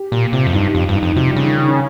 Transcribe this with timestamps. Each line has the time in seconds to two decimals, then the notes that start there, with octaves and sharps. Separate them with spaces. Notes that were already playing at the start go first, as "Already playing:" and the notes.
Already playing: G4
0.12 A#2 G4
0.33 C3 F4
0.47 F2
0.53 G2 D#4
0.67 G4
0.74 F2 F4
0.89 G2
0.96 D#4
1.02 F2
1.16 C3 F3
1.31 G3
1.36 C#3
1.44 D#3
1.58 D#3
1.68 C#4